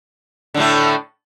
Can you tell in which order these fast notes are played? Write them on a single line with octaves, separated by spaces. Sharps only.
D3 A2 A3